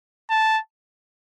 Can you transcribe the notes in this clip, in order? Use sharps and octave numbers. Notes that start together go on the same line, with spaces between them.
A5